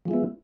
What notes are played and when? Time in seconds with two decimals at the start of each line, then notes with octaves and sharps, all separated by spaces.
0.05 F3
0.08 G#3
0.11 E4
0.14 B3